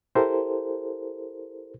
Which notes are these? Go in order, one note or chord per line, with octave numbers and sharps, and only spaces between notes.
E4 G4 A4 A#4 C5